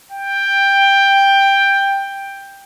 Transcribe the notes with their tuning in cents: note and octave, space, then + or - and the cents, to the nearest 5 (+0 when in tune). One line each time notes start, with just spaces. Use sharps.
G5 +10